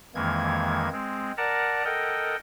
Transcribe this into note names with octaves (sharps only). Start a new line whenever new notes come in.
F2 D#3 E3 G#3 A#3 G#6
G#3 C4
A#4 D5 F#5 A5 A#5
A4 A#4 D#5 F#5 G5